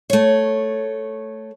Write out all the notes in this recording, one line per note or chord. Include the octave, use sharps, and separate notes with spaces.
A3 C#5